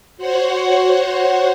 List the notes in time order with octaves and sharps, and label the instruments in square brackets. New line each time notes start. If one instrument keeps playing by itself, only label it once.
[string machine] F#4 C5 C#5 F#5